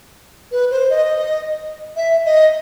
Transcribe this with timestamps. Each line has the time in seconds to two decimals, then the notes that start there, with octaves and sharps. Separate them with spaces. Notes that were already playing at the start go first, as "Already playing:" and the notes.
0.52 B4
0.71 C5
0.90 D#5
1.96 E5
2.25 D#5